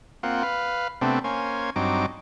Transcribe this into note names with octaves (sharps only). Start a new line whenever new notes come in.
A#3 C4 F4 F#5
B4 F5
C3 A3 B3 C4 D4
A#3 C#4 C5 G#5
G2 F#3 C4 D#4 D6